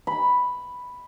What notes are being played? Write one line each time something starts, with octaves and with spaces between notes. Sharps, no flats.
B5